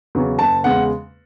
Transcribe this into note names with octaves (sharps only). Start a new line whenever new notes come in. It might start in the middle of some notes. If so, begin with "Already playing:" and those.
E2 C#3 F#3
F#1 A5
E2 C#3 G#3 F#5